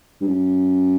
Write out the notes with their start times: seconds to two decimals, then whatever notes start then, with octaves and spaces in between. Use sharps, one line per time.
0.21 G2
0.27 F#2